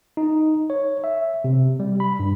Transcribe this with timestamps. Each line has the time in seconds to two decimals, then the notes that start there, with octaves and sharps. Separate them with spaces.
0.17 D#4
0.70 C#5
1.04 E5
1.44 C3
1.80 G3
2.00 B5
2.19 G2